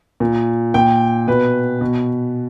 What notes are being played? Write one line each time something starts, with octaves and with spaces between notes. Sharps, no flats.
A#2
A#2 G5
B2 B4
B2